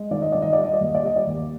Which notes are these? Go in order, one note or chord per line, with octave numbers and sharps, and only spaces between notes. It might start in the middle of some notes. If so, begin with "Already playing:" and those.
Already playing: G#3
D#3 D5
D#5
D#3 D5
D#5
G3 D5
D#5
D5
D#2 D#5
D5
G3 D#5
D5
D#2